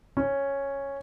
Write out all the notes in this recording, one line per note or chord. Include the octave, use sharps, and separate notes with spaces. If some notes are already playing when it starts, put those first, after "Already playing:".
C#4